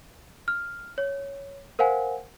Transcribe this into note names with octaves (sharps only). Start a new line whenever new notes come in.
F6
C#5
A#4 C5 F5 F#5 G#5